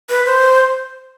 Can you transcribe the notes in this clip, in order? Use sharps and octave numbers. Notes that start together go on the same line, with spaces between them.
B4
C5